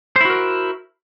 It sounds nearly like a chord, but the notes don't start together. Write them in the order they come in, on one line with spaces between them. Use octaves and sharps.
C5 E4 F#4 A#4